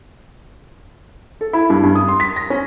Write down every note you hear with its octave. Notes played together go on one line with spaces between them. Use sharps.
A4
E4
G2
G2
D#6
C6
B6
A#6
C#4